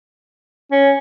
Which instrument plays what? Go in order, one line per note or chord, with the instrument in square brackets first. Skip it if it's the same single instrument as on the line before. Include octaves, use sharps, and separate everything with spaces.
[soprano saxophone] C#4